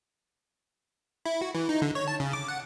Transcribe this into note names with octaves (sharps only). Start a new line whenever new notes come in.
E4
F#4
E3
D#4
D3
C#5
A5
C#3
D6
F#5